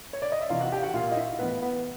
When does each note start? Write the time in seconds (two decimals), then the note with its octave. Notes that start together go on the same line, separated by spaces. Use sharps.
0.13 C#5
0.22 D5
0.32 D#5
0.41 E5
0.49 C3 E3 F4 F5
0.61 F#4 F#5
0.72 G4 G5
0.83 F#4 F#5
0.94 A#2 F4 F5
1.11 D#5
1.16 E4 E5
1.38 A2 E3 B3 B4
1.61 B3 B4